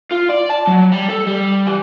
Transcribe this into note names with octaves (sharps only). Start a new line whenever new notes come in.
F4
D5
A5
F#3
G3
A4
G3
E3